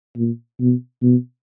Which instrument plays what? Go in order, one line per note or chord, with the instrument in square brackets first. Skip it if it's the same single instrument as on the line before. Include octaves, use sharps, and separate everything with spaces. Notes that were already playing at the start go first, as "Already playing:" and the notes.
[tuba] A#2
B2
B2